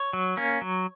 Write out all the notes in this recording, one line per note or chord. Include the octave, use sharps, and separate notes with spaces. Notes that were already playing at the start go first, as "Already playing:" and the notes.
Already playing: C#5
F#3
A#3 C#4
F#3